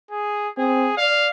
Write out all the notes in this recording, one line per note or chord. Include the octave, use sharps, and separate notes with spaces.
G#4
C4 G#4
D5 F5